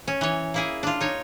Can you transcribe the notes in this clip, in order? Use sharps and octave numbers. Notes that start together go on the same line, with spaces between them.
C#4
E3 C#5
A#3 E4 G#4
D4 F4
D#4 C#5